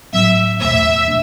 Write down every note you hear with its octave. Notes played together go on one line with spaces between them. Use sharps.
A2 F#3 C4 E5
E2 B2 A3 E5
B2 A3 D4